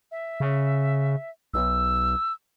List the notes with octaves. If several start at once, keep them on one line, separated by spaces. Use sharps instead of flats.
E5
C#3
B1 E6